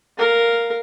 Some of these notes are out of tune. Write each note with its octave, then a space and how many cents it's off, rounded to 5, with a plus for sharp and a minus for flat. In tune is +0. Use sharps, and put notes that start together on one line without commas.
A#4 +0 F5 +0